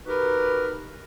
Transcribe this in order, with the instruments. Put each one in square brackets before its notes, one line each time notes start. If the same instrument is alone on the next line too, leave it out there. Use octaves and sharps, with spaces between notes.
[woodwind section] D#4 F#4 G4 A#4 B4